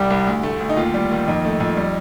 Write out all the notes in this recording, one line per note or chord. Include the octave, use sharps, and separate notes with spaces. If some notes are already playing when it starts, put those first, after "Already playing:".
Already playing: C2 G3 G4
C2
D2
A3
D2
D#4
D#2 F4
G3
D#2
F2 D#4
A3
F2
G3